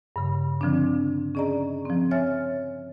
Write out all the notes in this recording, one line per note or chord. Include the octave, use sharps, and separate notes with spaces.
G2 C#3
D3 F3 C4 D4
C#4 G#4 D5 D#5 A#5
F3 C4
C#5 E5 G#5 F6 A6